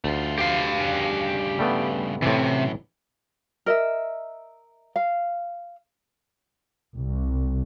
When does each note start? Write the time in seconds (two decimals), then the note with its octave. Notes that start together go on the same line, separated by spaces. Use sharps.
0.04 D2 A3 F4
0.38 G4 F5
0.80 G2 C#3
1.59 G3 A3 B3
2.22 F#2 A2 C3 E3
3.66 A#4 D#5 E5
4.96 F5
6.93 C2